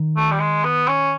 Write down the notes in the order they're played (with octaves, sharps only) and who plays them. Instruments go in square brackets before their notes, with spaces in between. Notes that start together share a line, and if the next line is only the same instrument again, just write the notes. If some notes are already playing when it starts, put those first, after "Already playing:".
Already playing: [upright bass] D#3
[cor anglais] A3
G3
G#3
B3
C#4